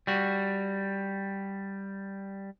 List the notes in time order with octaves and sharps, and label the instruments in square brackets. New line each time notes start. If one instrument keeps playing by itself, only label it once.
[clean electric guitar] G3 F#4